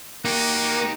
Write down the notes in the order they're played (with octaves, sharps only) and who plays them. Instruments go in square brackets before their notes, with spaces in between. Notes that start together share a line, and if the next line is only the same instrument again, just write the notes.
[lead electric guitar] A#3 [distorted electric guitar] D#4 G4 [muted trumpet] F#4